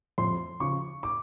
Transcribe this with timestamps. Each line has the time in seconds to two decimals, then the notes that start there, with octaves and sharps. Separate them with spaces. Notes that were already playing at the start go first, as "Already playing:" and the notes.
0.18 F2 C6
0.60 C#3 F3 C#6
1.03 D6